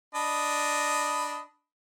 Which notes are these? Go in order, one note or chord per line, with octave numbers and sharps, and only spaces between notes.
D4 D#5 B5